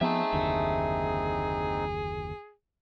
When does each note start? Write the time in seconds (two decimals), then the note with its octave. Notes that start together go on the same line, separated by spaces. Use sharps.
0.01 F3 B3 C4 D#4 G#4 E5 A5
0.33 F#1 D#2 D3